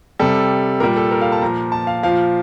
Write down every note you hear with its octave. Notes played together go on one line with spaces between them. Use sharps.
C3 G3 A4
A#2 G3 A#4
A4
A#4
F5
A5
A#2 F3 A#5
A5
F5
A#2 F3 F5